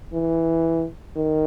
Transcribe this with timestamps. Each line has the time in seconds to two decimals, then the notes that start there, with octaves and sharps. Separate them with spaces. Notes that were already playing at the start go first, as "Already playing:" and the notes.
0.13 E3
1.16 D#3